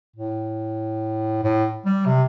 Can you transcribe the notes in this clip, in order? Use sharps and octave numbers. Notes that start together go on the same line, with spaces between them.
A2
A2
G3
C3